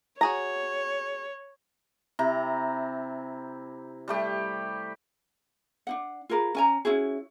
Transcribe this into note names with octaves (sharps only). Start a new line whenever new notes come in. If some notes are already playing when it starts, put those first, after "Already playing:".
F#4 G#4 C#5 A#5
C3 E4 A#5
G3 A3 G4
D4 D#4 F#5
F4 G#4 A#4 B4
C#4 G#5 A#5
C#4 E4 F#4 G#4